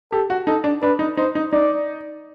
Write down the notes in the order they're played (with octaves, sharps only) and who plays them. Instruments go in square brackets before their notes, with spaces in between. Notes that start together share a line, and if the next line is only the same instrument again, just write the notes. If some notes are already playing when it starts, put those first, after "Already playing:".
[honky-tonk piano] G4 [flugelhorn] A4
[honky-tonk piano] F#4
[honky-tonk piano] D#4 [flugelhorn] A4
[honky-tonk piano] D4
[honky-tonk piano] D4 [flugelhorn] B4
[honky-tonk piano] D#4
[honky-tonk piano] D#4 [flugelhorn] C5
[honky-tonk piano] D#4
[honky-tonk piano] D#4 [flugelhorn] D5